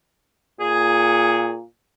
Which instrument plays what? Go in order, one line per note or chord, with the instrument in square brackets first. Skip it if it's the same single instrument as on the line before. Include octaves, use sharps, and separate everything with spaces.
[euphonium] A#2 [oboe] G#4